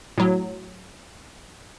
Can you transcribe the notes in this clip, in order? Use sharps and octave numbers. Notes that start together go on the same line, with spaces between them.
A2 F#3